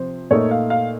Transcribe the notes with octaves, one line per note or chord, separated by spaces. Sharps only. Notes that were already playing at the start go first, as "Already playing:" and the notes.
Already playing: C3 F3 C5
A#2 A3 D#4 C#5
F5
F5